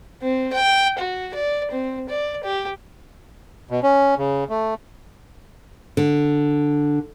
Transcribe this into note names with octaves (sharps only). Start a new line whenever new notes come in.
C4
G5
F#4
D5
C4
D5
G4
B2
C#4
C#3
A3
D3